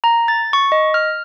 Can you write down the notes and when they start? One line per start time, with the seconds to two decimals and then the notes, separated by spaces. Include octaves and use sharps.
0.04 A#5
0.28 A6
0.53 C#6
0.72 D#5
0.94 F6